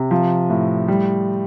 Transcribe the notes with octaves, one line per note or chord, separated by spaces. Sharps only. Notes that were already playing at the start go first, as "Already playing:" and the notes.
Already playing: C3
F3
A2
G3